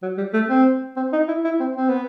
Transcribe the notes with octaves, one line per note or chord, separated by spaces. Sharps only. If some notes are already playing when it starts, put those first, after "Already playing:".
F#3
G3
A3
C4
C4
D#4
E4
E4
C4
C4
B3